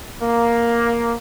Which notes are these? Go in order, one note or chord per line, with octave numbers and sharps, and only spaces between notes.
A#3